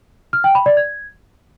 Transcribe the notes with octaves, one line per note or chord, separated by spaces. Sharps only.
F6
G5
B5
D5
G#6